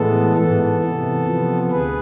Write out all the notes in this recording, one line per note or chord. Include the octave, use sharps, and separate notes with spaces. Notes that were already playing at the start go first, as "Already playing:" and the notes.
Already playing: A2 E3 G#3 B3 A4
G#2 E3 B3 A4
C3 E3 B3
C3 F3 B3
D2 G#4 B4